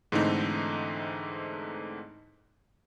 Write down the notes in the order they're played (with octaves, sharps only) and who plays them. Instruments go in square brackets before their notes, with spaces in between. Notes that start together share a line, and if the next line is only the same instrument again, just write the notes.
[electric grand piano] G#2 D3 E3 A3 C4 D#4